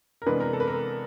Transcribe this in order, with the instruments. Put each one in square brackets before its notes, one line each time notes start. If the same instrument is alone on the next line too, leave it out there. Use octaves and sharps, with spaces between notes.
[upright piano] A#4
C3 E3 G#3 B3 D4 B4
A#4
A4
B4
A#4